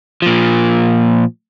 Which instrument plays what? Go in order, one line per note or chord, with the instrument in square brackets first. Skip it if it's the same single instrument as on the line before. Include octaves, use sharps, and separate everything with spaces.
[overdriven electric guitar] A#2 F3